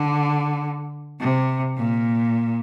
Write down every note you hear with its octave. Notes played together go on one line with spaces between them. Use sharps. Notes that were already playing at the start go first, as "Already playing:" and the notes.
Already playing: D3
C3
A#2